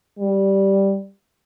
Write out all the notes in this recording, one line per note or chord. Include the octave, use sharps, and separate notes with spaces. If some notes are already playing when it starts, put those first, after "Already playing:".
G3